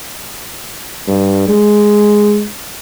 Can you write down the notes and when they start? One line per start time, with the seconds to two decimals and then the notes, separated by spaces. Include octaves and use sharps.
1.08 G2
1.48 G#3